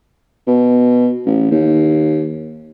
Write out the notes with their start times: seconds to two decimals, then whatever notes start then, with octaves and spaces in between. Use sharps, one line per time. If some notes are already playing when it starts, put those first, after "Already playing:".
0.47 B2
1.26 A1
1.51 D#2